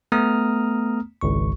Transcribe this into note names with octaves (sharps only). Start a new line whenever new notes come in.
A3 B3 A#5 D#6 F6
G#1 C#2 C#6